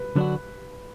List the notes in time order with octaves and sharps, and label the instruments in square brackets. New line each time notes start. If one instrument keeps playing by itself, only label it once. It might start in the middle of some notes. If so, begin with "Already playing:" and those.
Already playing: [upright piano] B4
[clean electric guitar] D3 F#3 D4 F#4